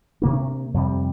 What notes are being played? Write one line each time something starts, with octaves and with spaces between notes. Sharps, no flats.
C3 A#3 D4
F2 C3 G3